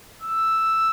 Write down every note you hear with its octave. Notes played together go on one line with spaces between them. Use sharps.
E6